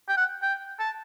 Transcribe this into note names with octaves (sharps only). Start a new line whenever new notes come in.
G5
F#5
G5
A5